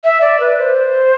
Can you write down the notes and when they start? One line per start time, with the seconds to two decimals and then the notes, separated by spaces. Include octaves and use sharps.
0.04 E5
0.21 D5
0.40 B4
0.58 C5